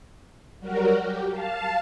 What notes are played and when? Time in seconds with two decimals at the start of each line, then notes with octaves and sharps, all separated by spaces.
0.60 F#3 G3 F#4 A#4
1.02 G4
1.32 F5 A5